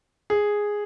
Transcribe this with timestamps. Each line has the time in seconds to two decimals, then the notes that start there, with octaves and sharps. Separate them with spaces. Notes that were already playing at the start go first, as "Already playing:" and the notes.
0.30 G#4